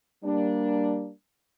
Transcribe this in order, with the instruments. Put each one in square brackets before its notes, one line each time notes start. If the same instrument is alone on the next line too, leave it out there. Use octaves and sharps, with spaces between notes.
[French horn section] G3 A#3 D4